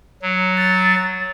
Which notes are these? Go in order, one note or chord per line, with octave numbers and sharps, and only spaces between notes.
F#3
A6